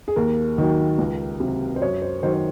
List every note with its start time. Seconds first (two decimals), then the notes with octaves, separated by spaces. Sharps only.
0.08 G#4
0.16 D#2 A#4
0.58 D#3 F#3
0.98 C#2
1.40 C3 F#3
1.76 C5
1.81 F#2 C#5
2.02 C5
2.23 D#3 F#3 C5
2.34 C5